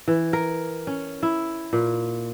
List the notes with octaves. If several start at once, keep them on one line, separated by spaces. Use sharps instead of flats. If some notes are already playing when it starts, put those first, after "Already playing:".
E3
A#4
C#4
E4
A#2